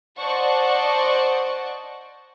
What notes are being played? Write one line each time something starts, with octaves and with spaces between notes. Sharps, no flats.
C5 D5 D#5 F#5 A5 C#6